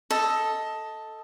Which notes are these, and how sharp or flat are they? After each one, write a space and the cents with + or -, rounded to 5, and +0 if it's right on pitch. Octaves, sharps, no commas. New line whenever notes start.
A4 +0 D#5 +20